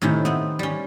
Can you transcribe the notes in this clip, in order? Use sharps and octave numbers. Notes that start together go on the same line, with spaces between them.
A2 C3 D#3 C#4 E4
B3 C4
G3 C#4